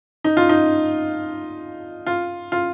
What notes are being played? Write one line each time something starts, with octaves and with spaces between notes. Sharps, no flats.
D#4
F4
D#4
F4
F4